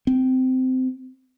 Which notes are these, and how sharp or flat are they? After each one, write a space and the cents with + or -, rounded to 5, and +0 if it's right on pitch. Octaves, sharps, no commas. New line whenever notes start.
C4 -20